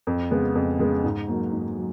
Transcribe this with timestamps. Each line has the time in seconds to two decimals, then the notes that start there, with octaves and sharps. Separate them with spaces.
0.07 F2
0.31 C#3 G#3 B3
0.55 F2
0.79 C#3 G#3 B3
1.04 G#2
1.28 F#3 A#3
1.53 G#2
1.77 F#3